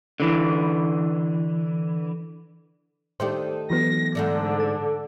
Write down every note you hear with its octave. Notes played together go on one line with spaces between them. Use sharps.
D3 E3
D#3 A3 D4 G4 C5
E3 F#3 B3 A#6
G#2 D3 A3 D4
A5